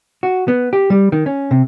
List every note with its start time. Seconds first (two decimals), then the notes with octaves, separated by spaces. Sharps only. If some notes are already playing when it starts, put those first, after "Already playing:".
0.23 F#4
0.48 B3
0.73 G4
0.90 G3
1.12 D#3
1.26 C#4
1.51 C3